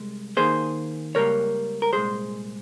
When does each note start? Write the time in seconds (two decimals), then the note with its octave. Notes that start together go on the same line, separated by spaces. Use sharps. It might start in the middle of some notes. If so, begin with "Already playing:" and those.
Already playing: C2 G#3
0.37 D#2 D#3 A#3 G#4 C5
1.15 C#2 C#3 G3 A#3 A#4 C#5
1.82 A#4
1.93 C2 A#2 G#3 G#4 C5